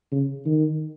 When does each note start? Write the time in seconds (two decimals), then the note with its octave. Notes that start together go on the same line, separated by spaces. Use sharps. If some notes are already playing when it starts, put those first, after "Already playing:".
0.12 C#3
0.45 D#3